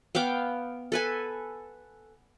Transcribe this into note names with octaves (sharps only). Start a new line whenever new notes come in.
B3 F5 G5 D6
A4 B4 G#5